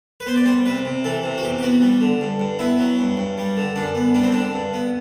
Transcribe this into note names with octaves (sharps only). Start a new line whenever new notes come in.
B4
B3 C5
D5
G3 C5
C3 B4
C3
E3 A4
C3
F#4
E2 G4
G4
B3 F#4
G3
D3
G2
G2
B3 E4
F#3
G2
G2
G3
D3
F#2 D4
B3
G3 D4
C4
D3 D4
G2
B3